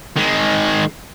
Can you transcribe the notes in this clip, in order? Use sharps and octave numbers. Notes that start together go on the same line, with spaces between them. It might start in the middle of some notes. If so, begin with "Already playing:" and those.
D#3 G#3